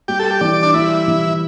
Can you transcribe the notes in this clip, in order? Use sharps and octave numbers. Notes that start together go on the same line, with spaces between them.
G3 G4
A4
G4
E3 D5
D4
G3 E4
E3